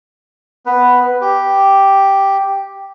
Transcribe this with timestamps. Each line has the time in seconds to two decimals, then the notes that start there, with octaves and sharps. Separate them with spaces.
0.66 B3 B4
1.21 G4